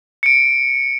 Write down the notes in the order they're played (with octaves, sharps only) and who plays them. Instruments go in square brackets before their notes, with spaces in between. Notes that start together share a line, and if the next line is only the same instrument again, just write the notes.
[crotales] C#7 D7